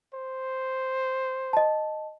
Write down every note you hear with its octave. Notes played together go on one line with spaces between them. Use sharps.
C5
D#5 A5